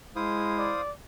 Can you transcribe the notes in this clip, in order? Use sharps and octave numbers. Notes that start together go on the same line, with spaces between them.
G#3 E4 C5 F5 D#6
D5